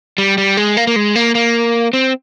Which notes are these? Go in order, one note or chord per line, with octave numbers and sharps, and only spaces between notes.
G3
G3
G#3
A#3
A#3
G#3
A#3
A#3
C4